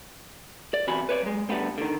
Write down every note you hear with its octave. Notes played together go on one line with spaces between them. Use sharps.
D5
B1 C3 E3 F#4 G#5 B5
B4 C#5 D5
F#3 G#3
D3 G3 A3 B3 C4
D3 D#3